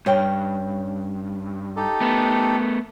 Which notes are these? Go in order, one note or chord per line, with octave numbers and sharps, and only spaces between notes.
G2 C#4 G5
D#4 G4 A4
A3 B3